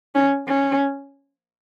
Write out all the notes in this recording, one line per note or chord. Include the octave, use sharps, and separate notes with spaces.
C#4
C#4